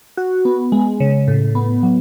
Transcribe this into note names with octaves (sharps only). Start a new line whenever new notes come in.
F#4
B3
G#3
C#3
A2
B3
F#3